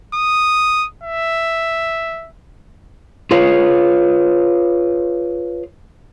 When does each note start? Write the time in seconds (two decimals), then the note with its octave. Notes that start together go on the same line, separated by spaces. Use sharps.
0.15 D#6
1.03 E5
3.31 F4 G#4 B4 C#5 F5